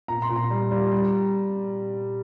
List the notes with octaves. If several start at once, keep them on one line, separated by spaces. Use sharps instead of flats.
A#2 A#5
C6
A#2
A#5
G3
G3
G3